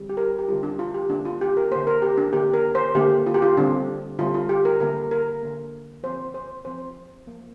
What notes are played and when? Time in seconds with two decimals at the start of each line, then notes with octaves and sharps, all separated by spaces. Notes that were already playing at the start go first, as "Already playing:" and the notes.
Already playing: D3 G3 C4
0.09 G4
0.17 A#4
0.39 G4
0.48 D3 G3 C4 F4
0.63 D4
0.79 F4
0.94 G4
1.09 D3 A#3 D4
1.25 F4
1.41 G4
1.57 A#4
1.71 D3 A#3 C5
1.87 A#4
2.02 G4
2.18 D4
2.33 D3 A#3 G4
2.54 A#4
2.75 C5
2.95 D3 A#3 G4
3.26 F4
3.34 G4
3.42 F4
3.57 D3 G3 C4 D4
4.18 D3 G3 C4 F4
4.34 F4
4.49 G4
4.65 A#4
4.80 D3 A#3 A#4
5.11 A#4
5.42 D3 A#3
6.03 F3 C4 C5
6.34 C5
6.65 F3 C4 C5
7.26 F3 A#3